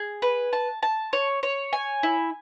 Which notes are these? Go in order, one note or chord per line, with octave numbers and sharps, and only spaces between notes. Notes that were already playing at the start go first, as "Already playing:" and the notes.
Already playing: G#4
B4
A5
A5
C#5
C#5
G#5
E4